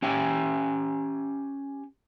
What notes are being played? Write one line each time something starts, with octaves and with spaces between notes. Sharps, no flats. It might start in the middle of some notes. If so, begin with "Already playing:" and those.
C#4 G4 G5 G#5